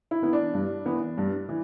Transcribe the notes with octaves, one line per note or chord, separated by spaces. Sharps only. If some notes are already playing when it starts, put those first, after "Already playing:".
E4
E3 B3
D4
G2
E3 B3
G2
E3